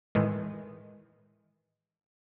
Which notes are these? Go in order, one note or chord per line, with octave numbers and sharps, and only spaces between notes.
A2 D#3 E3 G#3